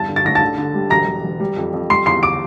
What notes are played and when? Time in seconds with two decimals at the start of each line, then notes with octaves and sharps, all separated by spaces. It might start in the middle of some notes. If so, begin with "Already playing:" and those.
Already playing: E2 G2 A5 A6
0.08 D3
0.16 A6
0.24 A1 A#6
0.35 A5 A6
0.41 D3
0.58 D3
0.74 G3
0.90 E1 A#5 A#6
1.07 E1
1.23 E1
1.40 G3
1.57 F2
1.73 F2
1.90 G3 C6 C7
2.06 E2 C6 C7
2.23 D6 D7